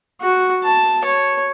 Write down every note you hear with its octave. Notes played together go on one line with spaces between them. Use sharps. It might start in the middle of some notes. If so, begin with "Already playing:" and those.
F#4
A5
C#5